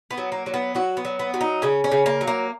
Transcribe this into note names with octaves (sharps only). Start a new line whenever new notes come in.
B3
F#3
A#3
F#3
B3
F#3 F#4
B3
F#3
B3
F#3
D#4
C#3 C#4
C#4
C#3
A#3
F#3
A#3